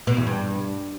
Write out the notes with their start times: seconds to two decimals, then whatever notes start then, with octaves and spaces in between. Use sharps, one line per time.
0.07 B2
0.17 E2
0.27 G2